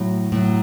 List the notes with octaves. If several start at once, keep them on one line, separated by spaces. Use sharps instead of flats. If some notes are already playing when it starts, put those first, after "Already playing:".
Already playing: A2 F#3
A2 F#3